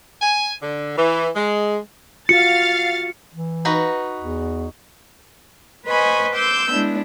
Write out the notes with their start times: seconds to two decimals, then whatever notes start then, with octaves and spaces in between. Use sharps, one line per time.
0.22 G#5
0.62 D3
0.97 E3
1.35 G#3
2.29 F4 F#4 F5 A6 C#7
3.34 E3
3.65 D#4 F#4 B4
4.19 E2
5.86 B4 C5 D#5 G#5 B5 C#6
6.34 C6 D6 E6 G6
6.71 G#3 B3 D4 E4